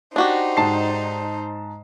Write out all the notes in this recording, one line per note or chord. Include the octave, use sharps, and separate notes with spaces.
D4 D#4 F#4 G4 C5
G#2 A5 C7